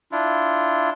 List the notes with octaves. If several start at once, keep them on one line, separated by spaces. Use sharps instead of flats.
D4 E4 F4